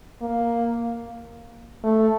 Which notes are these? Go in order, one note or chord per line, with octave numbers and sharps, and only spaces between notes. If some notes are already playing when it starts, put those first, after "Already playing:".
A#3
A3